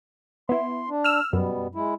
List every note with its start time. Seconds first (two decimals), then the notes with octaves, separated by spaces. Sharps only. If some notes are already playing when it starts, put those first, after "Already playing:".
0.49 B3 E4 C6
0.89 D4
1.04 E6 F6
1.33 F#2 B2 G3 B3
1.75 G#3 E4